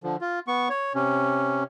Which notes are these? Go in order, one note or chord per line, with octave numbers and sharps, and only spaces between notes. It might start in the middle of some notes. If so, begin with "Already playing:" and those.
D3 F3
F4
B3 C#6
C#5
C3 C#4